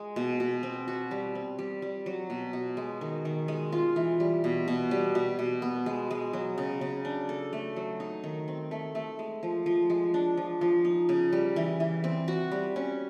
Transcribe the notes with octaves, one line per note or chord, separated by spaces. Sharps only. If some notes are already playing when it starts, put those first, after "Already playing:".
Already playing: G#3
B2
B2
C4
F#4
G3
C4
G3
G3
F#3
B2
B2
G#3
D#3
D#3
G#3
F4
E3
G3
B2
B2
G3
B2
B2
B3
G#3
G#3
F#3
C#3
C#3
D4
A4
A3
F#3
D#4
D#3
C4
A3
A3
G#3
F3
F3
G#3
D4
F3
F3
D#4
C#3
G3
E3
E3
C4
F#4
G3
C#4